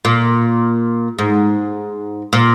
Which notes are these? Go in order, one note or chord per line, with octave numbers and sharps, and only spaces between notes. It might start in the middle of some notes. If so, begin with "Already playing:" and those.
A#2
G#2
A#2